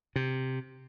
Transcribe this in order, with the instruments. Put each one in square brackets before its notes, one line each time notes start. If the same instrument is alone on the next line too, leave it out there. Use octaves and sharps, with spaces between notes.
[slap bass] C3